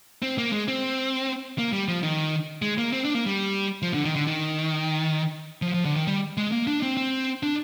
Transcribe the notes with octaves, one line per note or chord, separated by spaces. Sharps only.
C4
A#3
G#3
C4
A#3
G3
F3
D#3
G#3
A#3
C4
D4
A#3
G3
F3
D3
D#3
D3
D#3
F3
F3
D3
D#3
G3
G#3
A#3
D4
C4
C4
D4